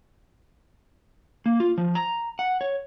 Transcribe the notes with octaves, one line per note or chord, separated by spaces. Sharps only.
A#3
F4
F3
A#5
F#5
C#5